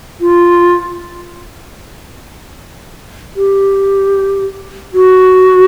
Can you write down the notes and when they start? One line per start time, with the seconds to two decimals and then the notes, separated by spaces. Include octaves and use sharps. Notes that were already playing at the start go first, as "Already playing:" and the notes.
0.21 F4
3.36 G4
4.94 F#4